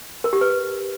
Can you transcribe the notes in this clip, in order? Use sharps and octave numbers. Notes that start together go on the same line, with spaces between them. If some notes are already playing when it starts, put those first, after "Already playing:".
A#4
G4
B4